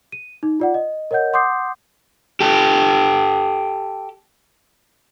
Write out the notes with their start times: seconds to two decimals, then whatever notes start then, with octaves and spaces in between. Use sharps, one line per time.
0.12 D#7
0.43 D#4
0.60 F4 D5 F#5
0.74 D#5
1.11 A#4 C#5 D#5 F#5 G6
1.33 F#5 C6 D6 D#6 G6 C7
2.40 G4 A4